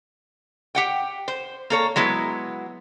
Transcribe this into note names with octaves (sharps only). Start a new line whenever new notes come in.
G4 F#5 G5
C5
A#3 A4 C#5
F#3 G#3 B3 E4